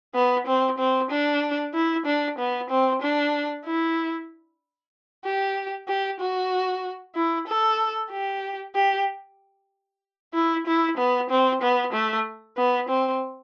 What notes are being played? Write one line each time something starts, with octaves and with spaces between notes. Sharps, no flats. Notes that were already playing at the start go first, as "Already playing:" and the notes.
B3
C4
C4
D4
E4
D4
B3
C4
D4
E4
G4
G4
F#4
E4
A4
G4
G4
E4
E4
B3
C4
B3
A3
B3
C4